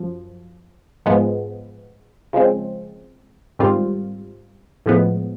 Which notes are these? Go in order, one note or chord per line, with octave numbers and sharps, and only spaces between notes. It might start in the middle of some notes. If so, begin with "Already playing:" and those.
Already playing: F#2 F3
G#2 F3 G#3 B3
C#3 F3 G#3 C4
G#2 D#3 G3 C4 F4
A2 F3 G#3 B3